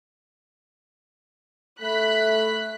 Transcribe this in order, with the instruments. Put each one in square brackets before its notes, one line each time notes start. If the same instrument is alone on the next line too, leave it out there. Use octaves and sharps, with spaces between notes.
[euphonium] A3 [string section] B5 F#6 B6